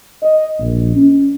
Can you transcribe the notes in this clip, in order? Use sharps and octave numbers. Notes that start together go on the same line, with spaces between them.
D#5
A#1
C#4